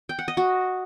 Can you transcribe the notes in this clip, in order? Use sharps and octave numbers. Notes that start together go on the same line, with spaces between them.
G5
F#5
D#5
F#4